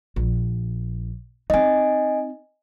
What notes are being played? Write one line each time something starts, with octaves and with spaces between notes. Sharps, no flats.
A#1
C4 D#4 D#5 G#5